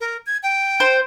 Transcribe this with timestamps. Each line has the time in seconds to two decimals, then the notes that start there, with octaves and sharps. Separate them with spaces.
0.01 A#4
0.26 G#6
0.43 G5
0.80 C5